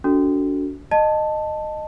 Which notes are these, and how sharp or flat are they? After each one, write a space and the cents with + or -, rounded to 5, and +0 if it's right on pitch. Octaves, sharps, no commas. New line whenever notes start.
D4 -40 F#4 +0 A4 +0
D#5 -15 A5 +5